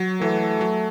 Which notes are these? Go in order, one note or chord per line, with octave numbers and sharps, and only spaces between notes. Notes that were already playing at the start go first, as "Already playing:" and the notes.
Already playing: F#3
E3 A3
F#3